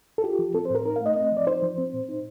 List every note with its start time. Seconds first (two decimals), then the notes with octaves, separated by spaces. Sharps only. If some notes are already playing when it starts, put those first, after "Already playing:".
0.18 A4
0.24 F4 G4
0.39 F3
0.54 C4 A4
0.65 C5
0.70 A2 A#4
0.85 D#4 A#4
0.96 F5
1.01 A3
1.06 D#5
1.16 C4 D#5
1.32 F3
1.37 D5
1.47 D#4 C5
1.62 F3
1.78 C4
1.94 A#2
2.09 D#4